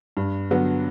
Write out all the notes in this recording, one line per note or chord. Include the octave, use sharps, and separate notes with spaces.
G2
D3 F#3 B3